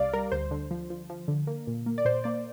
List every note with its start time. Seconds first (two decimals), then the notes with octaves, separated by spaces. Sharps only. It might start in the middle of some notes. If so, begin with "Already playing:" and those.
Already playing: C2 G3 D5 F5
0.13 G3 A#4
0.32 D2 C5
0.51 D3
0.71 F3
0.90 F3
1.10 F3
1.28 D3
1.47 A#3
1.67 A#2
1.86 A#3
1.98 D5
2.05 A#2 C5
2.24 A#3 D5